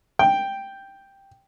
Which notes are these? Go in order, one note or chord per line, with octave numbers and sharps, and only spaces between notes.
G5